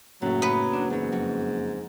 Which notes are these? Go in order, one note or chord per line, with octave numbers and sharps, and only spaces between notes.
F#1 A2 F#3 A3
B3 B4
D4
E2 G#2 F#3
F2 F#4